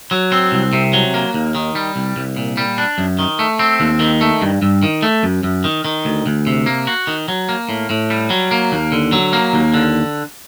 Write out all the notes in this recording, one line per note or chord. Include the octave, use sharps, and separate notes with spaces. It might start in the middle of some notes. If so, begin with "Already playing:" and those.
F#3
C4
C2
C3
F#3
A#3
D#2
D#3
G3
C2
C2
A#2
G3
D4
F#2
D#3
A3
C4
D#2
D#3
A3
G2
G2
D#3
A3
F#2
F#2
D#3
D#3
D2
D2
C3
A#3
F#4
D#3
F#3
A#3
A2
A2
G3
F#3
A#3
D#2
D3
F#3
A#3
D#2
D3